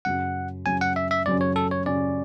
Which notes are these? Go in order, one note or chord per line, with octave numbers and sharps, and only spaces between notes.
F#2 C#3 F#3 C#4 F#5
F#2 C#3 F#3 C#4 G#5
F#5
E5
E5
F#2 C#3 F#3 C#4 D5
C#5
A4
C#5
F#2 C#3 F#3 C#4 D5